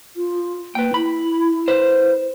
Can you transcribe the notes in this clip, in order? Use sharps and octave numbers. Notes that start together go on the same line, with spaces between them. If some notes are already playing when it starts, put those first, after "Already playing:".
F4
A#3 B4 G5
E4 B5
B4 C5